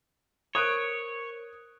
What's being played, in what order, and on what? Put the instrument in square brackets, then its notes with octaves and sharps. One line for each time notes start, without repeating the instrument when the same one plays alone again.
[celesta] A#4 C5 [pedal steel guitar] C#5 [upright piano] D#6 F#6 D7